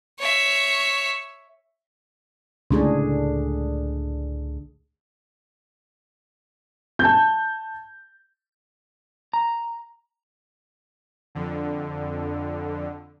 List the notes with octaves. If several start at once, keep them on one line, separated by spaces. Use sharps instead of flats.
C#5 E5
C#2 A2 D3 D4 G#4
A5 G6
A#5
F2 D3